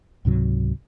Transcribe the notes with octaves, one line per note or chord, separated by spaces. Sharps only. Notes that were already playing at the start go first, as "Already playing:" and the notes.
C#2 G#2 C3 F#3